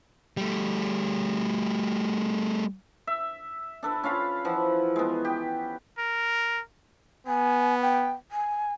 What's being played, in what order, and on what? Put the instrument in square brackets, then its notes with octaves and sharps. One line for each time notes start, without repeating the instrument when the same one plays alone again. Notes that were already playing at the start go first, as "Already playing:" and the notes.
[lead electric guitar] G3 A3
[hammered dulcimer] E5
D4 A4 B4
C#4 F4 F5 B5
E3 F3 F#5
G#3 B3
G4
[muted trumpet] A#4
[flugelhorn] B3 [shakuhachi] G#5
[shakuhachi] G5
G#5